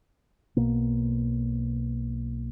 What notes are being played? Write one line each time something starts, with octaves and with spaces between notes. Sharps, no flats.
B1 B2 A#3